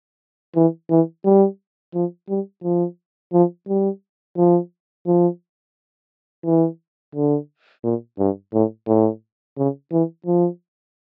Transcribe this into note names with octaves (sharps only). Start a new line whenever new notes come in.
E3
E3
G3
F3
G3
F3
F3
G3
F3
F3
E3
D3
A#2
G2
A2
A2
C#3
E3
F3